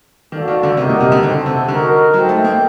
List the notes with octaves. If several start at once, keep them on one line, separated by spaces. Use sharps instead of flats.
D#3 A#3 F#4 A4 D5
D#3
D3
C3 D#4 G4 A#4 D#5 F#5
A#2
C3
D3
D3 C4 F#4 A4
C3
D3 D#4 F#4 A#4
F#3 D#4 A4 C5 G5
A3
A#3